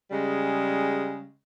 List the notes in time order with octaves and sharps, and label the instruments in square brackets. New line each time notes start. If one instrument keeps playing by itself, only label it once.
[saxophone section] C#3 G3 G#3